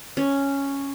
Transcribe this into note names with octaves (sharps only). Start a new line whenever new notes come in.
C#4